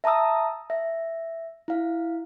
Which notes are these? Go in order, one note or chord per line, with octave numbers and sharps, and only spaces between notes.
E5 A5 A#5 D#6 E6
E5
E4 F5